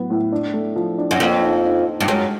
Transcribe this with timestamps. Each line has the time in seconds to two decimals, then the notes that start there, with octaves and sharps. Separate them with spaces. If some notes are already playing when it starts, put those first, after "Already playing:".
Already playing: A2 F#3 B3
0.10 A2
0.32 D4
0.54 A3
0.76 F3
0.98 D4
1.11 F#2
1.20 F2 A#3
1.42 D#4
1.64 D#4
1.86 C5
2.00 G2
2.08 F#2 G#3